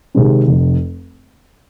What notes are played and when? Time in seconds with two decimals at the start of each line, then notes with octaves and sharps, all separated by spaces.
0.14 C3 D#3 G#3 C4
0.47 F1